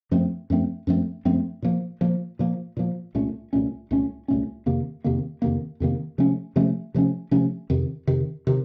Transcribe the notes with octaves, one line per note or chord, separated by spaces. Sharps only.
F#2 F3 A3 C4
F#2 F3 A3 C4
F#2 F3 A3 C4
F#2 F3 A3 C4
A#2 F3 A#3
A#2 F3 A#3
A#2 F3 A#3
A#2 F3 A#3
C2 A#2 A3 C#4
C2 A#2 A3 C#4
C2 A#2 A3 C#4
C2 A#2 A3 C#4
F2 C3 D#3 A#3
F2 C3 D#3 A#3
F2 C3 D#3 A#3
F2 C3 D#3 A#3
C3 F3 A3 C#4
C3 F3 A3 C#4
C3 F3 A3 C#4
C3 F3 A3 C#4
F2 C3 D#3
F2 C3 D#3
C3 D#3